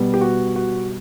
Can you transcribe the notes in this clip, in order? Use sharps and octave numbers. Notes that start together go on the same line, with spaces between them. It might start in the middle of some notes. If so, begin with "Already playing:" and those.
Already playing: B2 G3 B3
G4
F#4
F#4